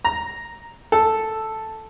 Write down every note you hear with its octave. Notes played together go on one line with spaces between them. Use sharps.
A#5
A4